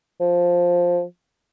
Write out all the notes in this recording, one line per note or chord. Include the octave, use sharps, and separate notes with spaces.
F3